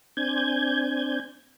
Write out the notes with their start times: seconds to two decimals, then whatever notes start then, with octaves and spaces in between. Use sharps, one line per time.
0.17 C4 D4 G#5 G6 G#6